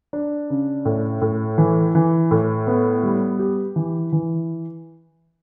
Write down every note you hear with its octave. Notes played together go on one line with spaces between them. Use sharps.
D4
C#3
A2
A2
E3
E3
A2
B3
G3
G4
E3
E3